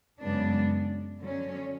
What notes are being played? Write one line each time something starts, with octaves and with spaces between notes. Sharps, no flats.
F#2 C#3 G#3 B3 D4
D3 F#3 C#4